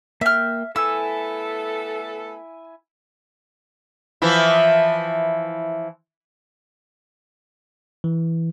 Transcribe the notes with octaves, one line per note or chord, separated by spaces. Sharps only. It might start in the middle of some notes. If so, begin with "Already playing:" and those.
A#3 E5 G5 F6
A3 B3 E4 A4 G#5 E6
E3 F3 E4
E3